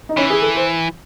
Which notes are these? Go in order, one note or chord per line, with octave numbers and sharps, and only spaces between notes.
D#4
E3 C#4
G#4
A4
C5